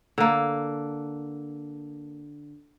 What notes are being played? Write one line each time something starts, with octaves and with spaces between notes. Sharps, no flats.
D3 A#3